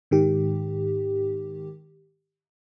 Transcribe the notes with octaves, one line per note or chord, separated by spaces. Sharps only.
G#2 D#3 G4